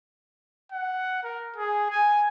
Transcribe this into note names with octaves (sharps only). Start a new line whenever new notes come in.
F#5
A#4
G#4
G#5